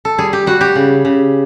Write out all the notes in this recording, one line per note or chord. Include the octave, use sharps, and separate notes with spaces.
A4
G3 G#4
G4
G3 F#4
G4
C#3
C#3